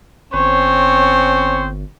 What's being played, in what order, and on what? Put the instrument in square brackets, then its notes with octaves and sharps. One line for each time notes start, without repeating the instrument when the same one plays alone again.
[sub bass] G1 [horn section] C4 C#4 C5 [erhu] C#5